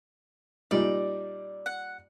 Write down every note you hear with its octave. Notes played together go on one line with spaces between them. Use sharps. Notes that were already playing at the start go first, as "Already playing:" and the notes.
A#2 G3 D#4 D5
F#5